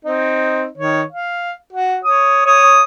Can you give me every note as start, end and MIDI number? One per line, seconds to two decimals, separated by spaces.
0.05 0.66 60
0.05 0.66 63
0.78 1.02 51
0.78 1.02 73
1.12 1.53 77
1.72 1.97 66
2.04 2.46 73
2.04 2.46 87
2.46 2.82 73
2.46 2.82 87